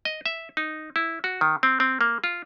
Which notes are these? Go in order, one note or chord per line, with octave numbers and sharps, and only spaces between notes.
D#5
E5
D#4
E4
F#4
D#3
C4
C4
A#3
F4